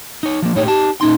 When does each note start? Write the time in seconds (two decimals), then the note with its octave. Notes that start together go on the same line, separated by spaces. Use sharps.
0.23 D#4 C#5
0.42 F3 A#3
0.56 A2 D#4 G4 C#5
0.67 D#4 G4 A5
1.01 A#2 C#4 D#4 C6